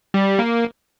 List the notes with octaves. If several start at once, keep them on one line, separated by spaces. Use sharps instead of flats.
G3
A#3